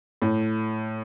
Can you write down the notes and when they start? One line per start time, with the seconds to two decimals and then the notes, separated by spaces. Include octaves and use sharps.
0.22 A2